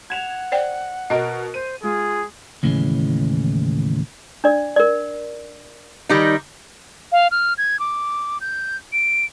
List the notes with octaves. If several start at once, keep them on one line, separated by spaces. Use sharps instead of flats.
F#5 G#6 E7 F7
C5 D5 G5
B2 A#4 D#5 D7
C5 D#7
G#3 F4 G#4
D#2 A2 C#3 E3 G#3 C#4
D4 D5
A#4 D5
D#3 G3 D#4
F5
F6
G#6
D6
G6
D7